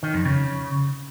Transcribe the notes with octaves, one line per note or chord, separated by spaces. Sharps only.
D#3
F2
C#3